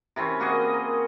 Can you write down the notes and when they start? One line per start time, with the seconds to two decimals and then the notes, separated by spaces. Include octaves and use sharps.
0.16 C3 E3 C4 C#4
0.40 A#3 F#4 G#4 D#5
0.74 A#4